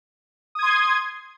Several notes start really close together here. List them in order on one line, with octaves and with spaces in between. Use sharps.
D#6 G#6 C6